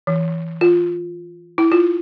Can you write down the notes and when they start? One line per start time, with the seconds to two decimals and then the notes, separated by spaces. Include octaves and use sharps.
0.07 E3
0.61 F4
1.58 E4
1.72 F4